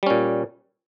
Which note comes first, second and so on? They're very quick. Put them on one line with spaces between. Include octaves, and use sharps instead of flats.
G3 C#4 A#2